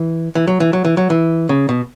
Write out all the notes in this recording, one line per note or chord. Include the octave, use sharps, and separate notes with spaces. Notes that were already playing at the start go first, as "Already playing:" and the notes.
Already playing: E3
E3
F#3
E3
F#3
E3
F#3
E3
C#3
B2